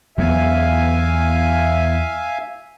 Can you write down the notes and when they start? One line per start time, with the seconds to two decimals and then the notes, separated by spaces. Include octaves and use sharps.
0.18 E2 F#3 B3 E5 F5 G#5